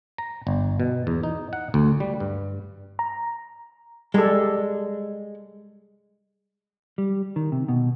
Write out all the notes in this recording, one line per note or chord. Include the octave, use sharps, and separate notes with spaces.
A#5
G1
B2
E2
D#4
F#5
D2
G3
G2
A#5
G3 G#3 A4
G3
D#3
C3
B2